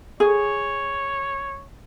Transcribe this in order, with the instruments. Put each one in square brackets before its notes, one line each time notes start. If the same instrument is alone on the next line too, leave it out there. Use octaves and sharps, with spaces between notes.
[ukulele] G#4 [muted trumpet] C#5